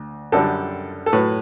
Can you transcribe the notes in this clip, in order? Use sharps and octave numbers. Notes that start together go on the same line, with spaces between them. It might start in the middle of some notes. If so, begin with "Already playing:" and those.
Already playing: D2
F#2 D3 G3 A4
A4
A2 F#3 B4